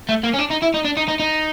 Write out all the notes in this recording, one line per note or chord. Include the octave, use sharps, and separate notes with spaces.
A3
A#3
C#4
D4
D#4
E4
D#4
D4
D#4
D#4
D#4